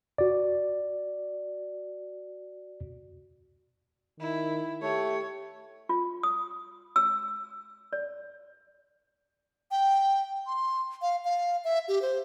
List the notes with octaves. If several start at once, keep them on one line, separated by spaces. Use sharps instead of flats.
F#4 D5
D#3 E4
A3 G4 C#5
F4
D#6
E6
D5
G5
C6
F5
F5
E5
G4
C5